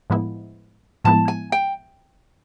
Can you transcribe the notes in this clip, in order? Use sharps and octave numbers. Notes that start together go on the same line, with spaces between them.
A2 F3 G#3 B3 E4
A2 F3 G#3 B3 E4 A5
G#5
G5